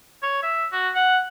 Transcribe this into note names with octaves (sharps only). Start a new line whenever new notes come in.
C#5
E5
F#4
F#5